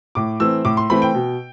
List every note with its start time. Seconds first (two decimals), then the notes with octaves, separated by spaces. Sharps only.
0.15 A2 D6
0.40 E3 A3 C4 E6
0.65 A2 D6
0.77 C6
0.90 E3 A3 C4 B5
1.02 G5
1.15 B2